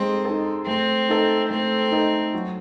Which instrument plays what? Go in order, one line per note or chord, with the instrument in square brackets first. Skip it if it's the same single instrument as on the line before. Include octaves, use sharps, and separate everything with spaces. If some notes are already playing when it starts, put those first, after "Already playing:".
Already playing: [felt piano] G#3 D#4 A4 [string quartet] C4
[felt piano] D#4 A4
[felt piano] A3 [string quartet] C4
[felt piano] D#4 A4
[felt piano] A3 [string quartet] C4
[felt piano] D#4 A4
F#3